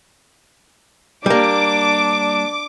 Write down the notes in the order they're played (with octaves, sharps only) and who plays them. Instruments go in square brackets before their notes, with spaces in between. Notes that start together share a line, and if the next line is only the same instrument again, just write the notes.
[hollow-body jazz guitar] G3 A#3 [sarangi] D4 [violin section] D6